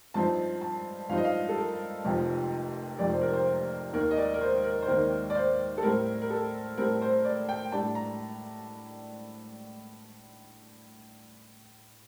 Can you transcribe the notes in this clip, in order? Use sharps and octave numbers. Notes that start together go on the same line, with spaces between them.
G2 F3 C4 D#4 A5
A5
G2 F3 C4 D#4 F5
D#5
F5
A4
A#4
F1 F2 C3 F3
F1 F2 C3 F3 D5
C5
A#4
C5
D#2 D#3 A#3 A#4
D#5
D5
A#4
C5
A#4
C5
D#2 D#3 A#3 A#4
D5
C5
A4
A2 G3 C4 A#4
A#4
A4
A2 G3 C4 A#4
C5
D5
G5
A2 G3 D4 A5
A#5